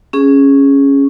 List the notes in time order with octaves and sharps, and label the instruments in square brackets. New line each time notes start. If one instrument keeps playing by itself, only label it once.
[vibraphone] C#4 G#4